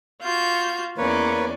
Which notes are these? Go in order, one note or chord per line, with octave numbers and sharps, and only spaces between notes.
F4 F#4 G6
E2 A#3 C#4 B4 C#5 D5